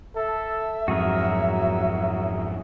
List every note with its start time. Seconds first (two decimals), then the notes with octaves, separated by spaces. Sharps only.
0.15 A4 E5
0.88 F2 G#2 F#3 F#4 G#4 A#4